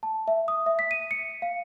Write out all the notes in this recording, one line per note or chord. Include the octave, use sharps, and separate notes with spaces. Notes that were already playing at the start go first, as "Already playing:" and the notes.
A5
E5
D#6
E5
B6
D#7
C#7
F5